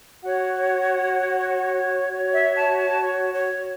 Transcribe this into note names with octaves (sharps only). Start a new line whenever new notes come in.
F#4 C#5 F#5
F#4 C#5
E5
A5
A5
C#5
C#5